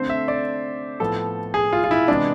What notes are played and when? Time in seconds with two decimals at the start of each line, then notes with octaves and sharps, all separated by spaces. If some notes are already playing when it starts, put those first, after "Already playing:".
Already playing: D3 A3 C4 C5
0.10 E5
0.28 D5
1.00 A2 F3 B3 A4
1.54 G#4
1.73 F4
1.84 F4
1.91 E4
2.08 C3 E3 G#3 B3 D4